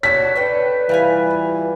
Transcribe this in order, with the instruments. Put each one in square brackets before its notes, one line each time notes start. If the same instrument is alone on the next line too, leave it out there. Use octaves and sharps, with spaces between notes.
[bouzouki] D4 F#4 [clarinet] C#5 [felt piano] B6
[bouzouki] D4 A4 G5 [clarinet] B4
[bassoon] E3 [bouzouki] G3 F4 G#5